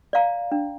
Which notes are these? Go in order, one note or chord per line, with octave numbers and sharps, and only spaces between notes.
D5 F5 A#5
D4